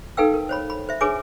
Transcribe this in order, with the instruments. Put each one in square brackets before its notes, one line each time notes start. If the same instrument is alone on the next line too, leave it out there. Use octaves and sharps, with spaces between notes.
[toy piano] D#4 A4 B4 F5 G5 E6
A#4
C5 C#5 B5
B5
C5 E5
D4 G#4 B4 C#5 G#5 D6